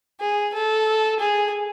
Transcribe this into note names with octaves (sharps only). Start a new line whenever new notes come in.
G#4
A4
G#4